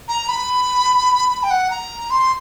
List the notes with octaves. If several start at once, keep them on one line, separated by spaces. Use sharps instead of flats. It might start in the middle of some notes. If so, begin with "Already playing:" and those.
A#5
B5
B5
G5
F#5
A#5
C6